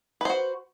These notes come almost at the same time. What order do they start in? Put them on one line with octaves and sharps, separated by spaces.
B4 C5 F#4